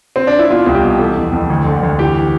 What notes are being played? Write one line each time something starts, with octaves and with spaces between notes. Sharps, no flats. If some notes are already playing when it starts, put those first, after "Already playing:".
C4
D4
E4
B2 F4
C2
G4
B2
E3 A4
F2
F2
D2
D3
D2
E3 G4